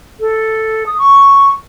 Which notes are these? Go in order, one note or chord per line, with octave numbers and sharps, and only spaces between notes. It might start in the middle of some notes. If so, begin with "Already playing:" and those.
A4
D#6
C#6